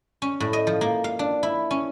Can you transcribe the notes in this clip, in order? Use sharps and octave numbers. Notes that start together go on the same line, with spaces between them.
C#4
A2
D#5
F3
A#3
F5
D4
E4
C#4